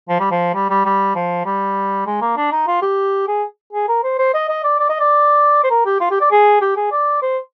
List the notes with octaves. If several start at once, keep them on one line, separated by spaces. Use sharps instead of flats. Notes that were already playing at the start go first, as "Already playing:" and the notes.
F3
G3
F3
G3
G3
G3
F3
G3
G#3
A#3
D4
D#4
F4
G4
G#4
G#4
A#4
C5
C5
D#5
D#5
D5
D5
D#5
D5
C5
A#4
G4
F4
G4
D5
G#4
G4
G#4
D5
C5